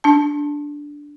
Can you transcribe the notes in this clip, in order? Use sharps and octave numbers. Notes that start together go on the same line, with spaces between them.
D4 A5